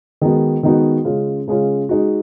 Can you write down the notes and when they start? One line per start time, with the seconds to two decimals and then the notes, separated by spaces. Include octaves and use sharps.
0.22 D#3 G#3 B3 D#4 F#4
0.63 D#3 G#3 B3 D#4 F#4
1.05 C#3 G#3 C#4 F4
1.48 C#3 G#3 C#4 F4
1.89 G#3 D#4 F#4